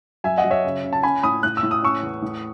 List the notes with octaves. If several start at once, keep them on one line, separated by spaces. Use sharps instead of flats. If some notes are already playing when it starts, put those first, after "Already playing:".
F#2 E5 G#5
D#5 F#5
F#2
C#5 E5
C#3
C#3
A5
C#4 G#5 B5
A2 B5 D#6
A2 F#6
E6
A2
D#6
C#4 C#6 E6
E2
A2